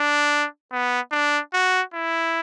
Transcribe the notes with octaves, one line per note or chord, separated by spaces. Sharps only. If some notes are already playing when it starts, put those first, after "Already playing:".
Already playing: D4
B3
D4
F#4
E4